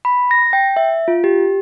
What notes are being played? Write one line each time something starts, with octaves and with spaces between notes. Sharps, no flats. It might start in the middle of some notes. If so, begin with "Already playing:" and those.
B5
A#6
G5
E5
F4
G4